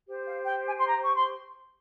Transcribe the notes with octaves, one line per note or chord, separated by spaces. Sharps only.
G4 C5
F5
G5
G#5
C6
A#5
C#6
C6